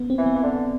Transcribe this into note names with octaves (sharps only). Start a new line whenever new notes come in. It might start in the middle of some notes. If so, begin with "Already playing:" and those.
Already playing: B3
C4
E3
B3
E3
D3